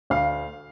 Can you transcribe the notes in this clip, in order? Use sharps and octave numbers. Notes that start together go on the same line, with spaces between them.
D2 F5